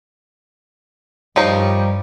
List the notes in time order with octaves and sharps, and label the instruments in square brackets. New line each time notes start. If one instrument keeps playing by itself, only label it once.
[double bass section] G2 [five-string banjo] F3 D#4 A#4 [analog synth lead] G3 [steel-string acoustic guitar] C#5